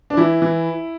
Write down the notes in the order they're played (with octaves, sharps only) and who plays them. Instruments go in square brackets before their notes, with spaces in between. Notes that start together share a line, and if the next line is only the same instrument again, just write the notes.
[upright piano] D4
E3 E4
E3